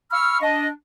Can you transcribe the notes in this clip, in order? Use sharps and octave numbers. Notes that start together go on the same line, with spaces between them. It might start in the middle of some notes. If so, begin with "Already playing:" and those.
F5 B5 C#6 E6 F6
D4 D#5